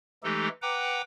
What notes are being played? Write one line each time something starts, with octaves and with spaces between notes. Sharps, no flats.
E3 G#3 A3 D#4 G4 A4
B4 F#5 G5 A#5 D6